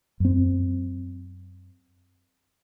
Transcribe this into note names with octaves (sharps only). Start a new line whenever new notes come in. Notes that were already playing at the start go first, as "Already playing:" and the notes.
F#2 C4